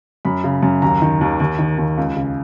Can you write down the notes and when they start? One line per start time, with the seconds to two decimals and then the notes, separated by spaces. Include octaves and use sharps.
0.25 F#2 B5
0.44 C#3
0.63 F#2
0.82 D#2 A#5
1.02 D#3
1.21 D#2
1.40 D#2
1.59 D#3
1.78 D#2
1.97 C#2
2.16 C#3